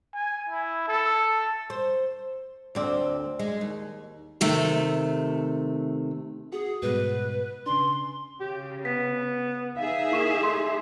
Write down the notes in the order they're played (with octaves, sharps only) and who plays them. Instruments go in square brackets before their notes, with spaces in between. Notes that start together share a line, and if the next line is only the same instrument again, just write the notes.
[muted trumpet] G#5
E4
A4
[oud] C5
D2 C4 D5
G#3
D#2
[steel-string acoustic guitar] C3 D#3 A3
[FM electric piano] F#4 [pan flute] G#4
[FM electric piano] G#2 B2 G3 [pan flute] B4
[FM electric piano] C#3 D4 [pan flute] C6
[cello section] C#3 [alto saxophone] G4
[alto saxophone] B3 [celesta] B6
[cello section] D#4 G#4 E5 [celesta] F5
[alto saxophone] A#3 [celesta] E4 C#6 E7
[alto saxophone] A3 [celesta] C6